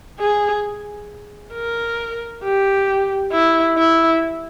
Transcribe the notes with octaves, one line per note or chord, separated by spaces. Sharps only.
G#4
A#4
G4
E4
E4